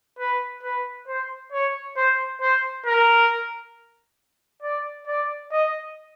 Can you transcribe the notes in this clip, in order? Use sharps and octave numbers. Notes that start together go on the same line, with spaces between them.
B4
B4
C5
C#5
C5
C5
A#4
D5
D5
D#5